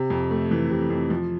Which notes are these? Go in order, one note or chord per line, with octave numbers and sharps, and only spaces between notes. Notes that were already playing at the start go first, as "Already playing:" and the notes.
Already playing: C3
F2
A3
E3
C3
F2
F3